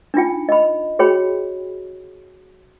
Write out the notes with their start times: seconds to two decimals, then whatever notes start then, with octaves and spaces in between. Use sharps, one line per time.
0.14 D4 D#4 F4 G5
0.49 D#5 B5
0.99 F#4 G#4 C#5 G5 B5